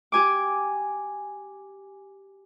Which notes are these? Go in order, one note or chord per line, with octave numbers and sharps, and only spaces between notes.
G4 G#5 D6